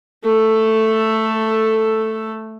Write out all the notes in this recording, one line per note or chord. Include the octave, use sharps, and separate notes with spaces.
A3 A4